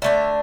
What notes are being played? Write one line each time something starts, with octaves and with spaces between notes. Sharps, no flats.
D3 A3 D4 E5